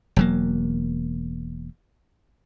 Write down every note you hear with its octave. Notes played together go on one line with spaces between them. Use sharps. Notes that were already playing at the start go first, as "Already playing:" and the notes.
E1 F#3 A#3